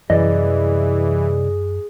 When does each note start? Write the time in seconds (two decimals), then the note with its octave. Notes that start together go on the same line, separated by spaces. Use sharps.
0.10 C2 F#2 E3 G#4 D5 D#5